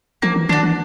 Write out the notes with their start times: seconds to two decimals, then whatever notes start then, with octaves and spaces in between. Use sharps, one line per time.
0.22 F3 A#3
0.36 E3
0.49 D#3 D4 F#4
0.63 E3